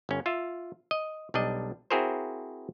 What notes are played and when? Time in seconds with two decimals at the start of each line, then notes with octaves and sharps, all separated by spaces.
0.09 G1 C#4
0.26 F4 E5
0.91 D#5
1.34 B1 G3 D4 D#5
1.90 C4 E4 F#4 G#4 A#4 C5